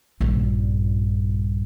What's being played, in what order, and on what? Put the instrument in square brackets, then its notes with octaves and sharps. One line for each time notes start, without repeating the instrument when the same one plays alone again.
[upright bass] A#1 G2